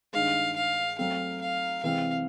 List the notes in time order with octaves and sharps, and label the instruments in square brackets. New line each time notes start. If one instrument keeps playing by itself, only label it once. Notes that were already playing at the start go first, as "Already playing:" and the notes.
[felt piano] G2 D#3 G#3 [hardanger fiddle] F5
[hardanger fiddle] F5
[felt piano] F#3 A3 C4 [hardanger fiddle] F5
[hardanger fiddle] F5
[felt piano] C3 E3 G#3 C4 [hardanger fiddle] F5